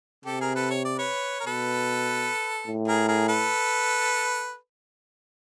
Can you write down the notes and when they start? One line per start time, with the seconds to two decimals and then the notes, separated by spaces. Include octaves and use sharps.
0.25 C3 G4 A4
0.40 G#4 A#4
0.55 A4 B4
0.70 C#5
0.84 D5
0.98 B4 C#5
1.40 A#4
1.46 B2 A4 B4
2.67 A2
2.88 G#4 A#4
3.08 G#4 A#4
3.28 A4 B4